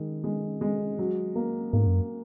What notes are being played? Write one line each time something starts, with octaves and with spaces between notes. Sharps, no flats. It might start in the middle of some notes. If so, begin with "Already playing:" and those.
Already playing: D#3 G#3
G#3
G#3
F#3
A#3
G#2 A#3
F#2